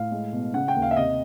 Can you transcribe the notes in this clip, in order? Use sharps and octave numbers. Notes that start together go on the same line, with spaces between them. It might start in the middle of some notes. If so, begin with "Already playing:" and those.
Already playing: A2 F5
G#3
B2
C#3 F#5
G5
D#2
F5
E5
C3 D#5